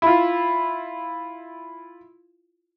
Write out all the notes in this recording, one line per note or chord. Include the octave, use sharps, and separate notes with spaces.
E4 F4